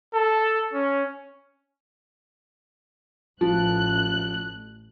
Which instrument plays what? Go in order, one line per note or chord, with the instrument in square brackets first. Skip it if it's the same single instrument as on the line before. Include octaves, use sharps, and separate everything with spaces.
[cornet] A4
C#4
[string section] A1 F#6 [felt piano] F3